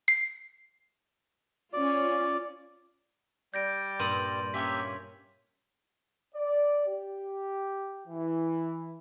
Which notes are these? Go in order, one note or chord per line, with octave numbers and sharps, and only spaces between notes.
C7
C#4 F4 D5
G3 D5 G6 A#6 D7
G2 A#2 C6 D#7 F#7
A#3 C#4 G4 C#5 E5 B6
D5
G4
E3